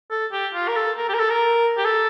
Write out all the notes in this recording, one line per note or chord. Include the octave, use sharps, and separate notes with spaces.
A4
G4
F4
A#4
A4
A#4
G4
A#4
A4
A#4
G4
A4